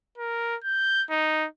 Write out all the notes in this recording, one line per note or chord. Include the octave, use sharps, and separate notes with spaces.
A#4
G6
D#4